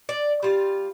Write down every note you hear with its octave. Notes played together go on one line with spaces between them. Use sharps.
D5
G3 F4